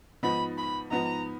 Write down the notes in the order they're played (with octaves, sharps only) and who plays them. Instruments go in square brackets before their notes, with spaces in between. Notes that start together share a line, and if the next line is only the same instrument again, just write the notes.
[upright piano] G#2 F3 B3 D#4 [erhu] B5
[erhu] B5
[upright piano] G#2 F3 B3 D#4 [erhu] A#5